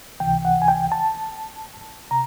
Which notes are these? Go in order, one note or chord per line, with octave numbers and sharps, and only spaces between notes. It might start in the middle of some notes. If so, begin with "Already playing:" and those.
C#2 C3 E3 G5
F#5
G#5
G5
A5
C3 A#5